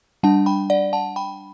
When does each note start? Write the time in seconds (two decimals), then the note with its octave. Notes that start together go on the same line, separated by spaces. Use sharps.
0.23 G3 D4 F#5 A5
0.46 G5 B5
0.70 D5 F#5
0.93 F#5 A5
1.16 G5 B5